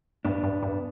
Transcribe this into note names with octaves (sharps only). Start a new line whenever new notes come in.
G2 B3 D4
G2
G2